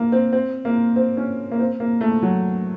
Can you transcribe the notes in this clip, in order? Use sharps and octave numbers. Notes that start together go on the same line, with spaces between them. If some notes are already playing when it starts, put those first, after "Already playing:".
Already playing: A#3
C4
C4
A#3
C4
C#4
A#3
C4
A#3
A3
F#3